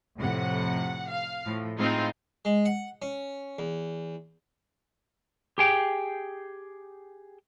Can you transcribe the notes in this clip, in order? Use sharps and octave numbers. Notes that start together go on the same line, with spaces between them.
F2 A2 C3 F#5
F5
A2 F3
A2 G#3 C4 D#4 F4
G#3
F#5
C#4
E2
G4 G#4 G5